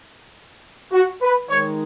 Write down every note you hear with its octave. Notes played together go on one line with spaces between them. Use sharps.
F#4
B4
D#3 G#3 D#4 C#5